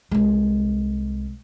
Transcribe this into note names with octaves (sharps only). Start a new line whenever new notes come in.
C2 G#3